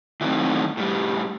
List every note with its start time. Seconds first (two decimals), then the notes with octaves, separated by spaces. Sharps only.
0.21 D#3 E3 F#3 A3 C4 D#4
0.77 A2 G3